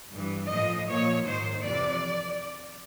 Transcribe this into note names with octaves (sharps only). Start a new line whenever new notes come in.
G2 E3
A2 F3 D#5
A#2 F3 C#5
G#2 D#3 C5
F2 C3 E3 D5